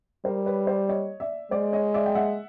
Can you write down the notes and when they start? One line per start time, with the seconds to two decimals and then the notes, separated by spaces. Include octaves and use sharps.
0.25 G3 A#4 C5
0.46 B4 C#5
0.67 C5 D5
0.89 C#5 D#5
1.20 D5 E5
1.51 G#3 C5 D5
1.73 C#5 D#5
1.94 D5 E5
2.06 G5
2.15 E5 F#5